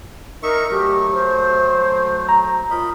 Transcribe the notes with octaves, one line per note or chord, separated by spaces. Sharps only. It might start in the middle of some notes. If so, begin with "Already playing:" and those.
D#4 A#4 E5 C#6
F#3 A3 G4
C5
A#5
F4 A#4 D#5 B5